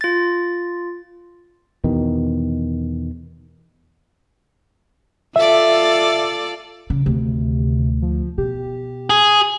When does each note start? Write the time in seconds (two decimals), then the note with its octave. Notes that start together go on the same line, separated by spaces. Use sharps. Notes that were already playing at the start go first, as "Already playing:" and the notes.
0.01 F4 A6
1.84 E2 B2 D#3
5.36 F4 A4 D5 E5
6.90 C#3
7.06 D2 C3 D#3
8.02 F3
8.38 B2 G4
9.10 G#4